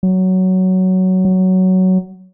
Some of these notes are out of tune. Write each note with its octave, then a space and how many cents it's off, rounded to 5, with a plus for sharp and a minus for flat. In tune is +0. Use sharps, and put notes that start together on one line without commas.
F#3 +10
F#3 +10